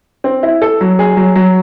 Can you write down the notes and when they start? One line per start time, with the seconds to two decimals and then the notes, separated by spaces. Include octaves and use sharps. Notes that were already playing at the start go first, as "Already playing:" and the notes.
0.24 C4
0.43 E4
0.62 A4
0.81 F#3
0.99 G#4
1.17 F#3
1.35 F#3